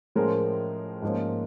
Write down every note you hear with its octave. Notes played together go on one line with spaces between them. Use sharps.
A2 F3 G#3 C#4 A#4 C5
G#2 F3 A#3 C#4